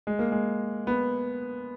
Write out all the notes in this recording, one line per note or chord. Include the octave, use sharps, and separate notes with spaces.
G#3
A#3
G#3
B3